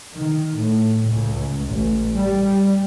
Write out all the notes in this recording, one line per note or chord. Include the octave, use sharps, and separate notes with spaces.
D#3
A2
C#2
A1
G3